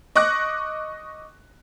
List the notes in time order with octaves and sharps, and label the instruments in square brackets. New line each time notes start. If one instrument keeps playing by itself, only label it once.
[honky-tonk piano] D#5 C#6 D6 F#6 A#6